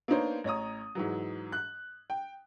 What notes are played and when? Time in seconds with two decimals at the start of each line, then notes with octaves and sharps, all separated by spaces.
0.08 A#3 B3 D4 D#4 C5 C#5
0.44 A1 C#5 A#5 D#6
0.95 G#2 E3 F#3
1.52 F#6
2.10 G5